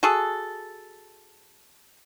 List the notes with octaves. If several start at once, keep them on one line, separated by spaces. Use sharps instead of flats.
F#4 G#4 A4